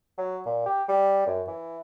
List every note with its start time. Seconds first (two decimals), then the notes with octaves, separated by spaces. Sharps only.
0.18 F#3
0.46 A#2
0.66 G4
0.89 G3
1.26 F#2
1.48 E3